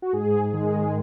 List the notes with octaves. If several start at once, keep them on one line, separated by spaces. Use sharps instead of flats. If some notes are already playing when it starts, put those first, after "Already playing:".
F#4
G#2 G#4
D#3 G#3